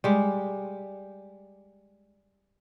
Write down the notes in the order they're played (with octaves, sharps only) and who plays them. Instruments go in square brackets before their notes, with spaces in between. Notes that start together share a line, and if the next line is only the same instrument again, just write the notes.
[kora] G3 G#3